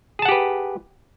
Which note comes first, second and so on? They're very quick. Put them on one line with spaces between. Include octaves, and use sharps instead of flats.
G#4 A5 F#5 G4 B4